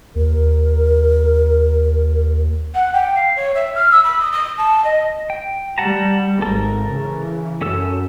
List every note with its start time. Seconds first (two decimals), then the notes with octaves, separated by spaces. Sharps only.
0.16 D#2 A#4
2.74 F#5
2.93 G5
3.15 F5
3.36 C#5
3.55 E5
3.75 F6
3.91 E6
4.04 B5
4.20 D#6
4.32 D#6
4.58 A5
4.84 D#5
5.30 G5
5.78 G3 F#5 A5 A#5
6.42 G#1 A4 A#4
6.90 C#3 E3
7.61 F#2 C#4 A4 E6